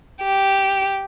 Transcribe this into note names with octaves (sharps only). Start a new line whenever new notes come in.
G4